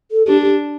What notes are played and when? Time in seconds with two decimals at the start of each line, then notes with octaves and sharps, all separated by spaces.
0.11 A4
0.27 D4 G4
0.42 G4